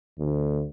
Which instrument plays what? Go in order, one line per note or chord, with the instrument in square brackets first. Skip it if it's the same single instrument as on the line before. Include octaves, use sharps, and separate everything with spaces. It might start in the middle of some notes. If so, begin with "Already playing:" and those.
[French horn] D2